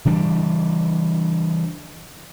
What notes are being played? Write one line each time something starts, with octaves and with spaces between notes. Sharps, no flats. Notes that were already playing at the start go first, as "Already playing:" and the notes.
C#3 E3 G3 D4